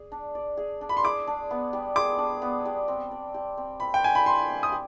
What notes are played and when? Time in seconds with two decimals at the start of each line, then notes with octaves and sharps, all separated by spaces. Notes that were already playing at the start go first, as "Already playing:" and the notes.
Already playing: G#4 D5
0.12 D4
0.35 D5
0.57 G#4
0.81 D4
0.89 B5
0.97 C6
1.03 G#4 D6
1.27 D4
1.51 B3
1.73 G3
1.96 G#4 D6
2.18 D4
2.42 B3
2.65 G3
2.88 C4
3.11 D5
3.34 G4
3.57 C4
3.80 C4 B5
3.94 G5
4.03 D5 G#5
4.15 B5
4.26 G4 C6
4.49 C4
4.63 D#6
4.72 G4